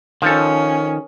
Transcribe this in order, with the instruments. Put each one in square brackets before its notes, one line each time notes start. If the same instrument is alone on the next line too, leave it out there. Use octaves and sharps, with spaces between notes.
[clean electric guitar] D#3 [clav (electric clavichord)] F3 A4 [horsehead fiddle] C#4